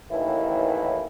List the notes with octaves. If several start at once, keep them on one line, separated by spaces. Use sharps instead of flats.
A1 D#2 D#3 E3 E4